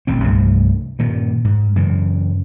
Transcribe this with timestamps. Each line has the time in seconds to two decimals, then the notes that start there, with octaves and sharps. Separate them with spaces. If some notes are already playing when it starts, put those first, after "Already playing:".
0.07 D#1 A1 C4
0.24 C2 G2 F3 A3
0.99 G2 A#2 D#3
1.44 G#2
1.76 F#2 C#3 E3